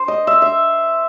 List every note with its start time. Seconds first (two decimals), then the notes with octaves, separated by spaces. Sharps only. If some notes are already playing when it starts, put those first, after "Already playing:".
Already playing: C5
0.08 D#5
0.27 E5
0.42 E5